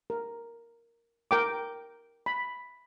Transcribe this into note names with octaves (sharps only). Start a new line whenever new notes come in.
A#4
A#4 G5 D6
B5